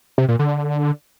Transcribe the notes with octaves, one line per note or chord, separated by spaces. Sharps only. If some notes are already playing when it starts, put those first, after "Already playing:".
C3
A#2
D3